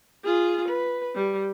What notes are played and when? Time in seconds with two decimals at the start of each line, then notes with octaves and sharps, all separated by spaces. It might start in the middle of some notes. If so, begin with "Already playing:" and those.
0.24 F4 G#4
0.68 B4
1.15 G3